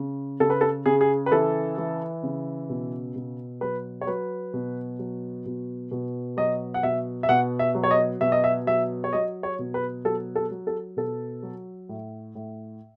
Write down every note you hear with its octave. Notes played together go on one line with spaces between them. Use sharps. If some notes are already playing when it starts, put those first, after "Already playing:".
Already playing: C#3
C#3 A4
B4
A4
C#3 G#4
G#4
B4
E3 A4
E3
C#3
B2
B2
F#3 B4
C#5
F#3 B4
B2
F#3
B2
B2
F#3 D#5
F#5
B2 E5
E5
B2 F#5
E5
F#3
C#5
D#5
B2 E5
D#5
E5
F#3 E5
C#5
F#3 D#5
C#5
B2
B4
F#3 A4
A4
F#3
A4
B2 A4
F#3
A2
A2